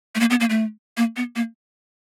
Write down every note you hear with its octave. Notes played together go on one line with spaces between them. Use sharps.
A3
A#3
B3
A#3
A3
A#3
B3
A#3